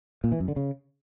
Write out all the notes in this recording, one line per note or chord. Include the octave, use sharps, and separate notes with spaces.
A#2
E3
F#2
D3
C#3